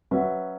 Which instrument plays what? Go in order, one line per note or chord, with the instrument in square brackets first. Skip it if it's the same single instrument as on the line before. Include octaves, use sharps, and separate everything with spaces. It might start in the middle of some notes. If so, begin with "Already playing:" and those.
[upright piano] F#3 C#4 F#4 B4 E5